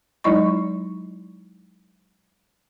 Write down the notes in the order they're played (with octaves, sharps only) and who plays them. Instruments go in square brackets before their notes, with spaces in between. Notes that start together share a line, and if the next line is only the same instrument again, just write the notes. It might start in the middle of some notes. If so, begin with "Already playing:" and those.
[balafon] F#3 G#3 D#4 E4 D#5 C#6